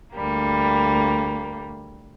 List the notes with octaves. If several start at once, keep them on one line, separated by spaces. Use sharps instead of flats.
D2 G3 A#3